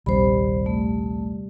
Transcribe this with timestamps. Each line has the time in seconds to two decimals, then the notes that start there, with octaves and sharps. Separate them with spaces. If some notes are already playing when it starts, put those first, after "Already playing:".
0.06 A#1 D#2 C3 G3 C5 B5
0.66 A3